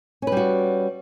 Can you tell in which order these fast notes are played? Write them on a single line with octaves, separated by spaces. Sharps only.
C#4 B4 G3 F#4